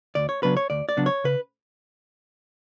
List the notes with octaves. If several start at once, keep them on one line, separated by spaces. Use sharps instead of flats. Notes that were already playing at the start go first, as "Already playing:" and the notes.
D2 D5
C#5
C#3 F#3 B3 D4 B4
C#5
D2 D5
D5
C#3 F#3 B3 D4
C#5
C#3 B4